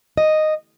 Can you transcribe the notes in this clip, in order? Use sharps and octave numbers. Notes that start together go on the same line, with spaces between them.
D#5